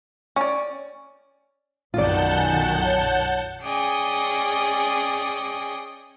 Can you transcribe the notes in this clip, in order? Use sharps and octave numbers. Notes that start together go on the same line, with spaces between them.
C#4 D5 C#6
B1 F#2 D#3 F4 D5 F#5 A5 G6
G#5
C#5
C#4 G#4 D5 D#5 G5 G#5